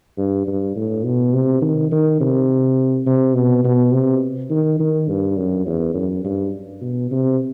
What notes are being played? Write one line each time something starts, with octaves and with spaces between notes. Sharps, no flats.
G2
G2
A2
B2
C3
D#3
D#3
C3
C3
B2
B2
C3
D#3
D#3
G2
F#2
E2
F#2
G2
B2
C3